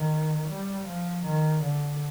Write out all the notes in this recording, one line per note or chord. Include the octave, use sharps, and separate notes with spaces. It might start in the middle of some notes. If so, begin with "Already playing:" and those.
Already playing: D#3
G3
F3
D#3
D3